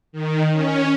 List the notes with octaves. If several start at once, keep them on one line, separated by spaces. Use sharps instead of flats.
D#3
C#4